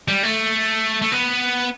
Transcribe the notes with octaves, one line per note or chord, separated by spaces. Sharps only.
G3
A3
A3
B3